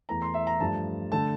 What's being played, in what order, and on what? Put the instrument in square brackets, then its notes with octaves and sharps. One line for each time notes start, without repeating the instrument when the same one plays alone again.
[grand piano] E2 E3 A3 A#5
C6
E5
A#5
G2 F3 A3 A5
D3 A3 A5